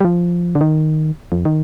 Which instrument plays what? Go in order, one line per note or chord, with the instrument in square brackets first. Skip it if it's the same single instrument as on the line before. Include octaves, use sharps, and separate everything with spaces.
[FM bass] G3
F3
D3
D#3
F2
D#3